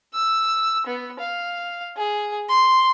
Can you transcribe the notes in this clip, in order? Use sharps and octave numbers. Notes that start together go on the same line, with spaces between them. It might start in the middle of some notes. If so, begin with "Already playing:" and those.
E6
B3
F5
G#4
C6